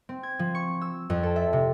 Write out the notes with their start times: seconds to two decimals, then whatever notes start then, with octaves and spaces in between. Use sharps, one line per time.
0.09 C4
0.23 G#6
0.39 F3
0.55 C#6
0.81 E6
1.10 F2
1.23 A4
1.36 E5
1.53 C3